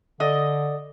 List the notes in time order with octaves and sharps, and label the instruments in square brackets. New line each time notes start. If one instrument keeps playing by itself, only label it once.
[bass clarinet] D3 [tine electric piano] A4 D5 [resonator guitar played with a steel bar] D#5